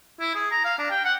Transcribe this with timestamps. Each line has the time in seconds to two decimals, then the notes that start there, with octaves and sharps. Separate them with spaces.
0.20 E4
0.35 G#4
0.51 A#5
0.65 F5
0.79 D4
0.90 G5
1.05 F#5